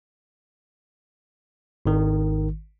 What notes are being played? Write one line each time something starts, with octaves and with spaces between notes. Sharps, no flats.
G#1 D#3